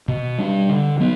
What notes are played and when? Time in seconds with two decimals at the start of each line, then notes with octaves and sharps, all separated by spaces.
0.08 B2
0.38 G3 D4
0.69 D3
1.00 F#3 B3